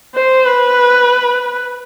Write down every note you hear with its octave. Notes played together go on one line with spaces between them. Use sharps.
C5
B4